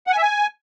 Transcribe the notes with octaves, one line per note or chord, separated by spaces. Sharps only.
F#5
G#5
E5
G#5